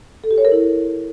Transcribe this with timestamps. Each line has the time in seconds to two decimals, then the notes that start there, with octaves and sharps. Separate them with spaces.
0.24 A4
0.31 G4
0.38 C#5
0.45 A#4
0.52 E4